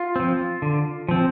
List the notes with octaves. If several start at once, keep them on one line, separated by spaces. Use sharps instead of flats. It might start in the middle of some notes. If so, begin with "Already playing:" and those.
Already playing: F4
F3 C4
D3
F3 C4